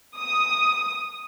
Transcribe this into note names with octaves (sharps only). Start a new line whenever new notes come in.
D#6